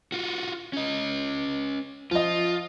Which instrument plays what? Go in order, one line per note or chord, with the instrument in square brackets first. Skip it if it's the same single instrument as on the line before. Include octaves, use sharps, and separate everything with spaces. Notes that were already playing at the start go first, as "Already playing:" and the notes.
[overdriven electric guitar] F4 F#4
C#4 D#5
[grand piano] F3 D#5 [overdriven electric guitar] F4